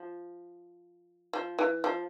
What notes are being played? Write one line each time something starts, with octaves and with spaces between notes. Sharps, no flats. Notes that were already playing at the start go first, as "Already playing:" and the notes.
Already playing: F3
F3
E3
F3